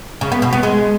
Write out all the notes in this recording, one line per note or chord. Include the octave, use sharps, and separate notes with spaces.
C#3
B3
B2
B3
G#3